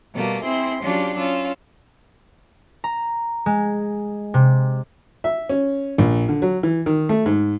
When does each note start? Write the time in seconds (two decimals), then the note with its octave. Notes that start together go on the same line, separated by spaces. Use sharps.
0.13 B2 G3 A3 A#3
0.43 C4 E4 G#4 C6
0.82 F#3 C#4 D4 F4 G4
1.18 C#4 F4 E6
2.84 A#5
3.46 G#3
4.34 C3
5.24 E5
5.49 C#4
5.98 A#1
6.29 D3
6.42 F#3
6.63 E3
6.86 D#3
7.09 A3
7.26 G#2